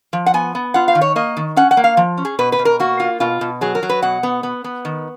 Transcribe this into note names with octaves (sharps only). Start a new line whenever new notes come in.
F3
F#5
B3 G#5
B3
F4 F#5
F5
D#3
C#5
A#3 D#5
D#3
C#4 F#5
F#5
A#3
F5
F3
C#4
G#4
B2 B4
B4
B2
A#4
A#3 F#4
F4
B2 F4
B2
F#3 G#4
A#4
F#3
B4
B2 F#5
B3
B3
B3
D#3